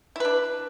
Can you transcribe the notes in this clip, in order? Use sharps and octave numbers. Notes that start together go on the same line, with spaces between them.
D4 E4 B4